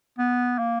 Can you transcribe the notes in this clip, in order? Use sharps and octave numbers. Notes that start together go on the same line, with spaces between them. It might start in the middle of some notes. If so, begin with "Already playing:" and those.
B3
A#3